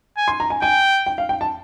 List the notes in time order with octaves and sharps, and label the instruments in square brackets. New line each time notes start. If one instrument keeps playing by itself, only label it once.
[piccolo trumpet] G#5
[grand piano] C6
A#5
G#5
[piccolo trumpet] G5 [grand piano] G#5
[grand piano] G5
F5
G5
A5